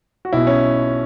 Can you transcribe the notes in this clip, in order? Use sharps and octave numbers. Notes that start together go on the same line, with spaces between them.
F#4
B1 B2 E4
C#4